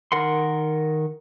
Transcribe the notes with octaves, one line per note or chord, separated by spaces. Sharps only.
D#3 A#4 F#5 C6